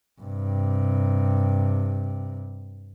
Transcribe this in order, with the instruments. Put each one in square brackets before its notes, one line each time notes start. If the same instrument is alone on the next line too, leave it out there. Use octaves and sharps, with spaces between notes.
[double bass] G2 C3